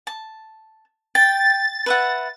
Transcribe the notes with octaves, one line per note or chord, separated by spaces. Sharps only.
A5
G5 A6
B4 E5 F#5